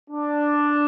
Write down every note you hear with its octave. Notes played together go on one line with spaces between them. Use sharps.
D4